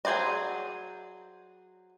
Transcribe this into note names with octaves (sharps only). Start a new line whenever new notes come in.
F#3 G#4 C5 D5 D#5